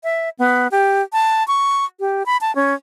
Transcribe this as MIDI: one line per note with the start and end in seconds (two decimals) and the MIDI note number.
0.04 0.29 76
0.39 0.67 59
0.71 1.02 67
1.13 1.46 81
1.48 1.85 85
2.00 2.26 67
2.26 2.37 83
2.41 2.54 81
2.55 2.74 61